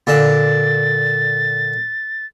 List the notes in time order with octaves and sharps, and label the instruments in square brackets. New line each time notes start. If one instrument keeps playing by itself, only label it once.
[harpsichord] A#2 D3 A5 [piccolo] A6